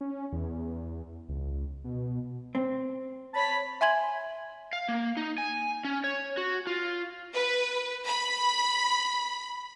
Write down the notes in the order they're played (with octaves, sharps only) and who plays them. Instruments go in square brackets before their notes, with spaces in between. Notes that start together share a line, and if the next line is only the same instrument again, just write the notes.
[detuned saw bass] C#4
E2
C#2
B2
[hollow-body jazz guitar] C4
[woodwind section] C#5 A5 B5
[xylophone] E5 G#5 C6 G#6 F#7
[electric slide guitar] F5
A#3
D#4
G#5
C#4
C#5
F#4
F4
[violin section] B4
B5